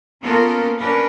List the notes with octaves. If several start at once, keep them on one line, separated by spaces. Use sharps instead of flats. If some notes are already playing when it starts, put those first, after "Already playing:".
A#3 B3 C#4 F4 A4 A#4
C#4 D4 A#4 B4